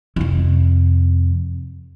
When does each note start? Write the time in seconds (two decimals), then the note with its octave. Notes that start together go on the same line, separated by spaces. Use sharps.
0.16 F2 C3